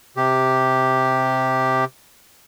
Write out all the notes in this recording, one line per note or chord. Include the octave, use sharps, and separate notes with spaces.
C3 G4